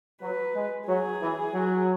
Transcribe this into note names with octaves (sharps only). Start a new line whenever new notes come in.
F#3 B4
G#3
F#3 G#4
E3
F#3